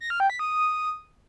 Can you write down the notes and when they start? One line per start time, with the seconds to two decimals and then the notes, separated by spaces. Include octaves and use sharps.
0.01 A#6
0.10 F6
0.20 G5
0.30 B6
0.39 D#6